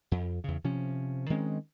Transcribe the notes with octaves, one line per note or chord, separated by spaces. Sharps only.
F2
E2 C#3
C3 F3 C#4
D#3 G#3 C4 C#4